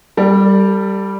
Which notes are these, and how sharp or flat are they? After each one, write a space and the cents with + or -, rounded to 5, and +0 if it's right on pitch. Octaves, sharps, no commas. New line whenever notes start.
G3 +0 A4 +35 D5 +0